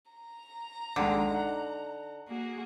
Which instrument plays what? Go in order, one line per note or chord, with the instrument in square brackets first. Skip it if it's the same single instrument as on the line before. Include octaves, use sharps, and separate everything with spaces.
[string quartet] A#5
[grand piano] A#1 D#2 G#3 [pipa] D3
[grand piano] D#4 F#5
[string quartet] A#3 F#4 G#4